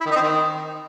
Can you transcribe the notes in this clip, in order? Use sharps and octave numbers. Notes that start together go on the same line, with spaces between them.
E4
D#3
D#4
C4
D#3